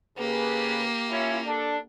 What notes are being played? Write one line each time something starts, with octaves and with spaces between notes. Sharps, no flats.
C#3 A#3 G4 G#4 B4
C#4 E4 F4
D4 A4